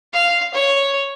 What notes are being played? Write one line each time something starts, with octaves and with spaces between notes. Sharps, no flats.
F5
C#5